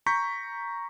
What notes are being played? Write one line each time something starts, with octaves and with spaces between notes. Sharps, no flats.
A#5 C#6 G6 B6